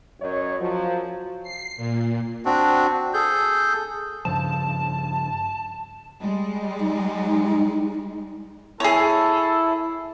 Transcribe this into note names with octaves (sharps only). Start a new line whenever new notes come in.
F#2 C#5 D#5
F3 F#3
C7
A#2
C4 D4 F#4
G#4 A4 G6
G2 C#3 F3 A5
G3 G#3
D#4
E4 G#4 A4 C#5